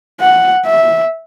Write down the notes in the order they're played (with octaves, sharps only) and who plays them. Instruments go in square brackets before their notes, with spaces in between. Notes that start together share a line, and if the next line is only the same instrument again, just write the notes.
[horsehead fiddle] F#5
E5